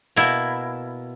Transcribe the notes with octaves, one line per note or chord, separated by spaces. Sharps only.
B2 A#3 E4